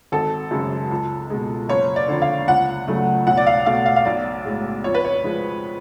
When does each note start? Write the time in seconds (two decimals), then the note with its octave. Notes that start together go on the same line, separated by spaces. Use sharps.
0.12 G#1 A4
0.51 F#2 C#3 G#3
0.91 C#2
1.30 B2 G#3
1.69 F#1 C#5
1.96 D5
2.08 F2 D3
2.22 F5
2.48 C#2 F#5
2.87 C#3 F#3 A3
3.27 B1 F#5
3.37 D5
3.47 F5
3.66 B2 A3 F5
3.86 F5
3.96 F5
4.05 B1 D5
4.45 A2 G#3
4.84 F2 C#5
4.94 B4
5.05 C#5
5.24 F3 G#3